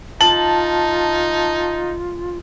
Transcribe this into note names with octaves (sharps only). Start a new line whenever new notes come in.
D#4 F4 A5 F#7